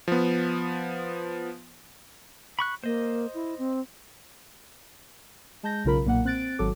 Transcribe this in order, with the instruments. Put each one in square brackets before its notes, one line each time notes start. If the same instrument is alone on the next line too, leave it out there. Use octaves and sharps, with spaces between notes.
[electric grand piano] F3 B3
[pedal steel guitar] B5 C#6 F#6
[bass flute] A#3 [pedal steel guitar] C5 D#5
[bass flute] E4
C4
[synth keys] G#3 A5 G6 A#6
B1 C#3 F4 A#4 B5
B1 A#2 A#3 F#5
C4 F#6 A6 D7
G#1 F#3 A4 D6